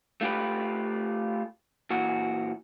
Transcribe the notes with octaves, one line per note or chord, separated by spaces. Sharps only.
A3 F4 G4 B4
A#2 E3 F#4